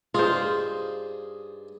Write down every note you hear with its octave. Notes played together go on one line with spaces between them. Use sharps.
G2 D#4 F4 G#4 C5